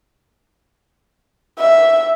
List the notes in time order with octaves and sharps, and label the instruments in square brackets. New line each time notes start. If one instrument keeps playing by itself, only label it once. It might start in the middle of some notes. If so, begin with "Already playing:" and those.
[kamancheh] E5